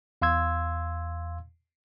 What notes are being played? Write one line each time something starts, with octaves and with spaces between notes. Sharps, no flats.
E2 F5 C6 E6 G#6